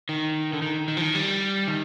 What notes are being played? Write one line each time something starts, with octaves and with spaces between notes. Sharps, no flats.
D#3
D3
D#3
D#3
F3
D#3
G3
D#3